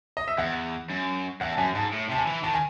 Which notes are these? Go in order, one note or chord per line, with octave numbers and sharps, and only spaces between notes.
D#5
E5
E2 F#5
F#2
E2 F#5
A5
F#2 G#5
G#2 A5
A2
C3 A5
G#5
E3
D#3 A5
G#5